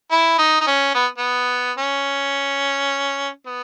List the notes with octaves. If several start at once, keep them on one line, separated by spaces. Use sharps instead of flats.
E4
D#4
D#4
C#4
B3
B3
C#4
B3